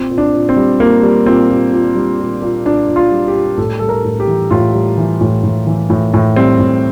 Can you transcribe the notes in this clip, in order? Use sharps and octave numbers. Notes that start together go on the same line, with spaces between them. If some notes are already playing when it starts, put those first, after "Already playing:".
Already playing: A#2 C4
A#2
D4
A#2
C4
G3
A#2 A#3
G3
A#2 C4
A#2
A#2
G3
A#2
A#2
A#2 D4
A#2
F4
G3
G4
A#2
A2 A4
G3 A4
A#4
A2
G4
E3
A2 F4
G3
E3
A2
A2
E3
A2
A2
G3 C4
A2